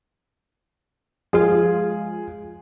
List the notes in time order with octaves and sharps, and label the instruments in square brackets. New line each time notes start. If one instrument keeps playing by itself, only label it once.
[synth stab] F3 G#3 F4 [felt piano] G#4